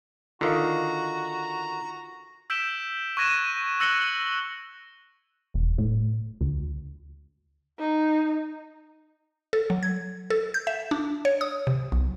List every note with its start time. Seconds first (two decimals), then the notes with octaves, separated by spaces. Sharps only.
0.41 D3 D#3 F4 F#4 F5 A#5
2.50 E6 G6 B6 D7 E7 G7
3.17 C#6 F#6 G#6 A#6 D#7 E7
3.80 E6 F#6 A#6 C#7 F#7 G7
5.54 E1
5.78 A2
6.41 D2
7.79 D#4
9.53 A4
9.70 F#3
9.83 G#6
10.30 A4
10.54 G6
10.67 E5
10.91 D4
11.25 C#5
11.41 D#6
11.67 C3
11.92 B1